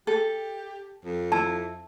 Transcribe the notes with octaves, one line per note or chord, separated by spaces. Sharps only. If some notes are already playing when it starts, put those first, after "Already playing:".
G4 A4
F2
E4 A5